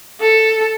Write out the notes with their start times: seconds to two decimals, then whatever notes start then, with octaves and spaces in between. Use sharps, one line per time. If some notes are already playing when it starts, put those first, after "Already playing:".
0.21 A4